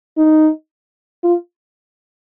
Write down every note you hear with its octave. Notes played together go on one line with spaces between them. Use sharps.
D#4
F4